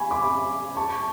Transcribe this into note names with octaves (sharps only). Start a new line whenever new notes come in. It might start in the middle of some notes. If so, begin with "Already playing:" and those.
Already playing: G#5 B5 C#6
B5 D6
A5 C#6